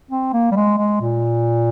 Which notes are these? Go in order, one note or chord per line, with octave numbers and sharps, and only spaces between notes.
C4
A#3
G3
G#3
G#3
A#2